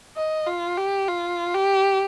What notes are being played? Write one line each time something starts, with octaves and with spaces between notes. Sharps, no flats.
D#5
F4
G4
F4
G4